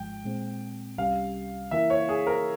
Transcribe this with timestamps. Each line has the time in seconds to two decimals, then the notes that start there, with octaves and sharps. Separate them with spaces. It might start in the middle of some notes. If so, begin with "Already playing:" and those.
Already playing: G#1 G#2 F3 G#3 G5
0.24 A#2 G#3 C4
0.98 C2 C3 G3 C#4 G4 F5
1.71 C#3 E3 A#3 E4 A#4 E5
1.90 C#5
2.09 G#4
2.27 A#4